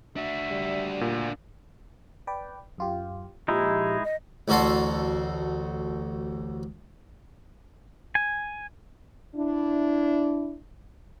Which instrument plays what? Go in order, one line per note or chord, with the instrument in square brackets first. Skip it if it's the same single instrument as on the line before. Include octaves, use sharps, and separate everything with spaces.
[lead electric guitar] D4 F#4 [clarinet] E5
[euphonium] G3
[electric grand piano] A#2
[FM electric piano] B4 D5 G5
F#2 F4 G4
[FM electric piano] A#2 F3 [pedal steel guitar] G#3 D#4 E4 [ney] G4
[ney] D#5
[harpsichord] A1 D2 F#4 A4 C6
[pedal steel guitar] G#5
[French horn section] D4 E4